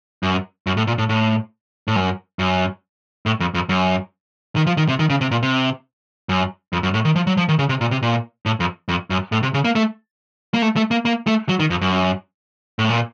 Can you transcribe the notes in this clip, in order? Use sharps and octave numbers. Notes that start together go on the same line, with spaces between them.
F#2
F#2
A2
A#2
A2
A2
A2
F#2
F#2
A2
F2
F2
F#2
D#3
F3
D#3
C3
D#3
C#3
C3
A#2
C3
F#2
F2
F#2
A2
D#3
F3
F#3
F3
D#3
C#3
C3
A#2
C3
A#2
A2
F2
F2
F#2
A2
C3
C#3
A#3
A3
A#3
A3
A3
A#3
A#3
A3
F#3
D#3
F2
F#2
A2
A#2